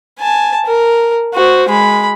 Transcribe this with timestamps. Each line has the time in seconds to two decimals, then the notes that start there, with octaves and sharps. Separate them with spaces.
0.19 G#5 A5
0.66 A#4
1.34 F#4 C5
1.69 G#3 B5